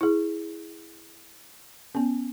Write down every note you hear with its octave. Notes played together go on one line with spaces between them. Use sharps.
E4 G#4
B3 C#4